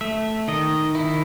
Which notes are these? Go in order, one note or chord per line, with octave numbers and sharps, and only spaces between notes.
A3 E5
D#3 D#5
D#3 E4